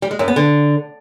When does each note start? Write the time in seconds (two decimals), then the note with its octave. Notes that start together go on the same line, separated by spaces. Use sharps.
0.02 G3
0.11 G#3
0.19 F#2
0.28 B3
0.36 D3